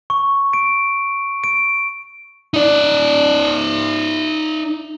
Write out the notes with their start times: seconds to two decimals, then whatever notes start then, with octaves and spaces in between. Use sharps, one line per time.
0.10 C#6
0.53 D7
1.44 D7
2.54 D#4 D5